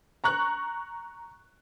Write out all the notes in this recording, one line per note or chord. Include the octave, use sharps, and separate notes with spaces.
A#5 C#6 F#6